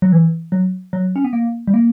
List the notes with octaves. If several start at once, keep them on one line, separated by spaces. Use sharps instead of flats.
F#3
E3
F#3
F#3
C#4
B3
A#3
G3
A#3